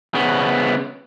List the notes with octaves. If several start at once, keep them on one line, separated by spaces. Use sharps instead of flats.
C#3 B3